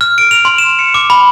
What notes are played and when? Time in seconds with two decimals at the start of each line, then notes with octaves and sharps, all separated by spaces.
0.01 F6
0.18 D7
0.31 F7
0.45 C6
0.58 E7
0.79 C#7
0.94 D6
1.10 B5